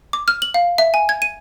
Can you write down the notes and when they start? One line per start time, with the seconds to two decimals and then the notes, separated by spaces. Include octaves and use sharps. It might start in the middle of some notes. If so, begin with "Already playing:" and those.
0.13 D6
0.28 F6
0.42 F#7
0.54 F5
0.78 E5
0.94 G#5
1.09 G#6
1.22 D#7